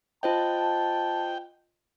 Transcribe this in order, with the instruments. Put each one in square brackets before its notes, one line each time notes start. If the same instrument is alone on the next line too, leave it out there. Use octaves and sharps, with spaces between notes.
[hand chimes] F4 C5 D#5 [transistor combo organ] G5 [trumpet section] A5